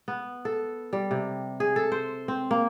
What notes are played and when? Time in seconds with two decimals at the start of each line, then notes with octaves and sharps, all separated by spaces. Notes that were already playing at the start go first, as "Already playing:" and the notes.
0.08 B3
0.45 A4
0.93 G3
1.11 C3
1.60 G#4
1.76 A4
1.92 C5
2.28 C4
2.51 A#3